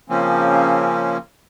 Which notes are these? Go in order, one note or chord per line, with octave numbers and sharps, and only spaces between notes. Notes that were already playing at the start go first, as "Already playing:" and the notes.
C#3 F3 A#3 C4 C#4